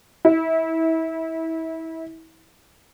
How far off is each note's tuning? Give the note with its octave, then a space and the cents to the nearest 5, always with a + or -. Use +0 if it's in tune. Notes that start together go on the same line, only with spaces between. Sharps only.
E4 -30